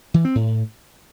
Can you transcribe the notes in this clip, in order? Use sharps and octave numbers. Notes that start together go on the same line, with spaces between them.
E3
C4
A2